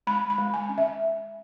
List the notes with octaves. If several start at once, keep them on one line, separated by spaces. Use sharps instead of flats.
G#3 B5
B5
G#3
G#5
C#4
E5